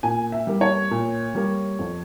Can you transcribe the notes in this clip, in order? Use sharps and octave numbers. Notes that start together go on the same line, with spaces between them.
A#2 G#5
E5
G3 A#3
C#5
A#2
G3 A#3
F2